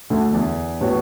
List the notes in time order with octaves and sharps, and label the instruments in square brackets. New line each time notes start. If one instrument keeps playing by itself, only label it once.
[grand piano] D2 D3
E2 E3
[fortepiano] A2 F#3 B3 F#4 C#5